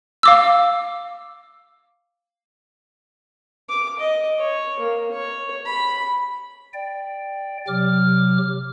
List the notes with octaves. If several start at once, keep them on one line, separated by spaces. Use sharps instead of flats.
F5 D6 E6
D6
D#5
C#5
A#3
C#5
B5
D5 G5
C3 F#3 D6 F6